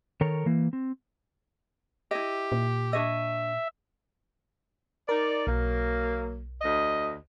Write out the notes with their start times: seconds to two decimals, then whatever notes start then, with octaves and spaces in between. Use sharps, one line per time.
0.21 D#3 A4 A#4 C#5
0.46 E3 A#3
0.73 C4
2.11 E4 G4 D#5
2.52 A#2
2.93 D4 C#5 D#5 E5
5.09 D#4 A#4 D5
5.47 B1 F#3 A#3
6.62 D2 D#5